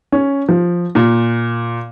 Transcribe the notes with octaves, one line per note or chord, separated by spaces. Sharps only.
C#4
F3
A#2